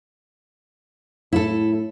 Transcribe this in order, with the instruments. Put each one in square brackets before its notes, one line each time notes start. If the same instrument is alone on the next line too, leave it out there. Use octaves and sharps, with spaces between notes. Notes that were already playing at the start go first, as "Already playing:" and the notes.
[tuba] A2 [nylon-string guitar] E4 A4